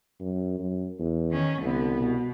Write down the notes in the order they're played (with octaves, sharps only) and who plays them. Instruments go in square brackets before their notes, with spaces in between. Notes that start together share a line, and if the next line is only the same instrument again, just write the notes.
[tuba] F#2
F#2
E2
[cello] D#3 C#4
[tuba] C2 [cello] D3 B3
[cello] B2